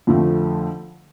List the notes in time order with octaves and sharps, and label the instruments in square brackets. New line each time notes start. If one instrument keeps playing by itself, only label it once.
[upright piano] F2 D3 F3 A3 C4